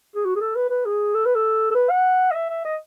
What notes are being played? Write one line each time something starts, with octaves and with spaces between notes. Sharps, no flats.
G#4
F#4
G#4
A4
B4
B4
G#4
A4
B4
A4
A4
B4
F#5
D#5
E5
E5
D#5